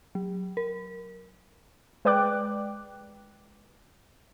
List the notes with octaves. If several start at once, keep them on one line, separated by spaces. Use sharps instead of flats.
F#3
A#4
G#3 B4 D5 G5 D6 F#6